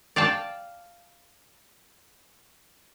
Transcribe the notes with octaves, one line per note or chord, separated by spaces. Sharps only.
D5 F5 G5 A5